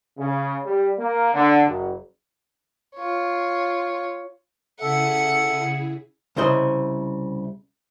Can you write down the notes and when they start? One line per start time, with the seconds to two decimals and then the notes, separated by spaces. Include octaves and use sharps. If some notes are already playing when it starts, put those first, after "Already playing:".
0.18 C#3
0.65 G3
0.99 A#3
1.34 D3
1.66 F#1
2.95 F4 C#5
4.80 C#3 E4 G#4 A4 E5 F#5
6.36 C2 C#3 E4 C5 D#5